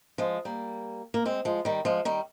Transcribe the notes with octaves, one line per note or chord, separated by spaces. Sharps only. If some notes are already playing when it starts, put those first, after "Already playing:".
F3 G#3
G3 A#3
A#3
G#3 C4
F3 G#3
D#3 G3
F3 G#3
D#3 G3